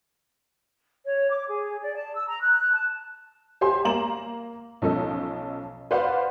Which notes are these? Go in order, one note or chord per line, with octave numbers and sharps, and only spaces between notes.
C#5
D6
G#4
D5
A5
E6
A#5
F#6
A5
G4 C5 G#5 C6
A#3 A#5 E7 F#7
B1 F3 C#4 A4 D#5
B4 C5 D5 F5 F#5